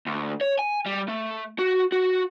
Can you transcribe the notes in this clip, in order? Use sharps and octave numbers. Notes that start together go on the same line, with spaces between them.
D2
C#5
G#5
G3
A3
F#4
F#4